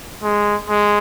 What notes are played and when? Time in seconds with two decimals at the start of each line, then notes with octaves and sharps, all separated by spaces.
0.23 G#3
0.69 G#3